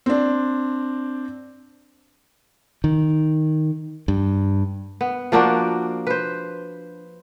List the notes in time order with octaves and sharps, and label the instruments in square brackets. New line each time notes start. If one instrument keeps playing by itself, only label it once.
[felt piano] C4 D4
[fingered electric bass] D#3
G2
[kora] B3
F3 A#3 D4 F#4
B4 C5